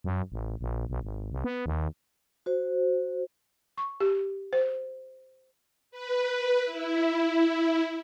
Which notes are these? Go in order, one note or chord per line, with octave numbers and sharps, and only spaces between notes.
F#2
A1
A#1
B1
G#1
C2
B3
D#2
F#4 C5
C#6
G4
C5
B4
E4